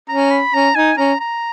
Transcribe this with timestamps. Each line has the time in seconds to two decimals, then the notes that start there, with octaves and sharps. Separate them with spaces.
0.09 C#4 A#5
0.31 B5
0.54 C#4 A#5
0.75 D#4 G#5
0.98 C#4 A#5
1.21 A#5